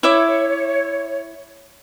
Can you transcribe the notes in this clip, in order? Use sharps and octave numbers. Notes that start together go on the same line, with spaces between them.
E4 C#5 E5 D6